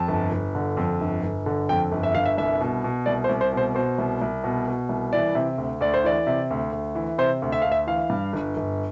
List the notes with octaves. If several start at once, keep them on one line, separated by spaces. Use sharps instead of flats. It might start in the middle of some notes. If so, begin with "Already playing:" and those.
Already playing: F2 A5
G1
G1
D3
F2
G1
G1
D3
F2 G5
G1
E5
G1 F5
E5
C2 E5
B2
B2
C2 D5
C5
C2
C5
B2 C5
B2 C5
C2
C2
B2
B2
C2
E3 D5
C3
D2
D2 D5
C5
E3 D5
C3
D2
D2
E3
C3 C5
D2
E5
D2 F5
E5
E3 F5
G2
G1
G1